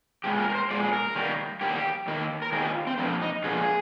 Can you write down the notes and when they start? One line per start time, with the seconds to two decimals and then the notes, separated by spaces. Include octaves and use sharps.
0.24 A#2 G#3 G4
0.39 A#4
0.50 A#4
0.55 C5
0.71 A#2 G#3 D5
0.84 G#4
0.93 A#4
1.15 D#3 G3 A#3
1.61 D#3 G3 A#3 G4
2.08 D#3 A#3
2.42 A#4
2.52 D#3 A#3 G#4
2.60 G4
2.65 F4
2.87 C4
2.98 D3 F3 A#3 C4
3.22 D#4
3.44 D3 F3 A#3 G#4